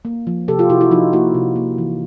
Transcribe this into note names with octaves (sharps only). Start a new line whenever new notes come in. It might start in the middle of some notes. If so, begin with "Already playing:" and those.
A#3
F3
C3 G4 A4
F4 G4
C3 E4 F#4
E4 F#4
F3 D#4 F4
A#3 E4 F#4
C3
A#3
E3